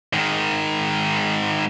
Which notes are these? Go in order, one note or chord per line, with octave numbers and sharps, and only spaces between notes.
G#2 D#3